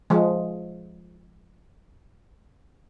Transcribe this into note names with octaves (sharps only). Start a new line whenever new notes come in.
F3 G#3